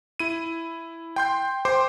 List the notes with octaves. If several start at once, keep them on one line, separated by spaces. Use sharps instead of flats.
E4 D#7
G5 C6 G6
C5 G5 C6 D6